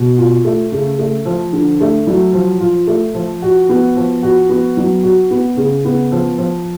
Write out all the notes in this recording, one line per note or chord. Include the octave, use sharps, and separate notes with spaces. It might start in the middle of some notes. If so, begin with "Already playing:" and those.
Already playing: B2
F4
A3
C#3
A3
F3
D3
A3
F#3
F3
F4
A3
F3
F#4
B3
F3
F#4
B3
F#3
F#4
B3
C#3
B3
F3
F3